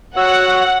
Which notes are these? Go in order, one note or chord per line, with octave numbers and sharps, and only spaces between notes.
F#4 C#5 F#5 E6